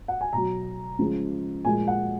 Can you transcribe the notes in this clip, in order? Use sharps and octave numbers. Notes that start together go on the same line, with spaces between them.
F#5
G#5
B2 F#3 A#5
C#3 F3 G#3
A#2 F3 G#3 G#5
F#5